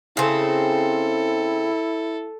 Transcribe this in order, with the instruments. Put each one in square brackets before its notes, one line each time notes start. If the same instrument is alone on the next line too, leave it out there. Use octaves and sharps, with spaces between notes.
[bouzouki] C#3 C4 [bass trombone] E4 [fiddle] A4